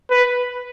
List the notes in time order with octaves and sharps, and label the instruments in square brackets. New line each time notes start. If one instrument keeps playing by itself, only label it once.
[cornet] B4